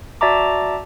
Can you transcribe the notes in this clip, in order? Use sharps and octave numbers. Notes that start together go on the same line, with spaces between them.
F#4 D5 E5 A5 A#5 D6